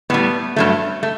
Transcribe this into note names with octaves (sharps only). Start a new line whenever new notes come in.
A2 G3 B3
G2 F#3 A3
A3